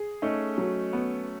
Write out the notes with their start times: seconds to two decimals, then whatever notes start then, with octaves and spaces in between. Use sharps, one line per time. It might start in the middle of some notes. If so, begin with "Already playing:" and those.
Already playing: G#4
0.22 A3 C#4 D#4
0.58 F#3
0.93 B3